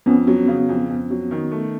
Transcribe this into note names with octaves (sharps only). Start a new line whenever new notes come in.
F2 B3 C#4
F#3
C#3
F2
F2
F#3
D#3
A3